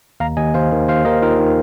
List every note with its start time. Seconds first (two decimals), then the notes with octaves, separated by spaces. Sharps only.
0.20 D#2 F5 A#5
0.37 D#2 D#5 G#5
0.54 D#2 C5 F5
0.72 D#3
0.88 D#2 C5 F5
1.05 D#2 A#4 D#5
1.22 D#3 F4 A#4
1.39 D#3